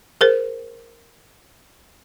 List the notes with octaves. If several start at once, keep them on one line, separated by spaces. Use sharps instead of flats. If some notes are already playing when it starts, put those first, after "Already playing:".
G#4 A#4 C5